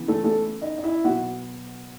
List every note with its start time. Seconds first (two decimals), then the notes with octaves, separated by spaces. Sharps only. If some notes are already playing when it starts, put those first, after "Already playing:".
Already playing: C#3 E3 B3
0.08 A3 A4
0.24 A3 A4
0.61 D#4 D#5
0.78 D#5
0.83 E4 E5
1.04 B2 F#3 B3 F#4 F#5